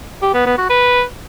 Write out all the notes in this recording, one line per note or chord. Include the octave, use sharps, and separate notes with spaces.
G4
B3
B3
F#4
B4